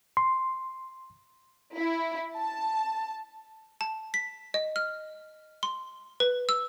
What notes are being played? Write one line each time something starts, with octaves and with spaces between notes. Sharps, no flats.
C6
E4
A5
A5
B6
D#5
F6
C6
B4
E6